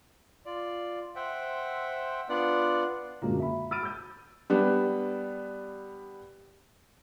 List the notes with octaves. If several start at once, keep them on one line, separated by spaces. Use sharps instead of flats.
F4 D5
C5 E5 F#5 G5
B3 D4 F4 D5 F#5
F#2 A#2 D3 F#3 G#3 A#3
E5 B5
B5 E6 F6 A6 D7 D#7
E6 G6
G3 B3 D4